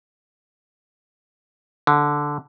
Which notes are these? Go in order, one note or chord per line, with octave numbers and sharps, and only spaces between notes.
D3